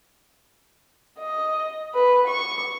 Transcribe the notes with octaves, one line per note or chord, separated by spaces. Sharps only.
D#5
B4
C#6